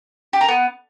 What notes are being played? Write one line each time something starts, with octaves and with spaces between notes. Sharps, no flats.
G4
A#4
B3